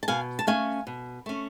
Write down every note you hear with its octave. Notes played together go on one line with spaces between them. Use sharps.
A5
B2 F5 G#5
A5
A3 C#4 F5 G#5
B2
A3 C#4